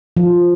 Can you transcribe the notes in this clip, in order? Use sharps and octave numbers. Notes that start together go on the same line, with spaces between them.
F3